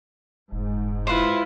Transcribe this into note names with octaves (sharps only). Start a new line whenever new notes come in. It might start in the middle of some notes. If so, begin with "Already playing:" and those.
F1 G#2
E4 F4 B4 C5